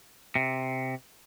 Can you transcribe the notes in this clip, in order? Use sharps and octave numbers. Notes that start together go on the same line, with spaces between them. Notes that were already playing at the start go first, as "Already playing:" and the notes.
C3